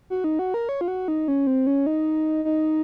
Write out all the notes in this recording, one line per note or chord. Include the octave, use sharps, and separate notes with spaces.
F#4
D#4
F#4
A#4
C#5
F4
F#4
D#4
C#4
C4
C#4
D#4
D#4